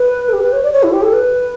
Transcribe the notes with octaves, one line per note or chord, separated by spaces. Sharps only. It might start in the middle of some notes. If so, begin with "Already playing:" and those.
Already playing: B4
A4
G4
B4
C#5
D5
C#5
E4
G4
A4
B4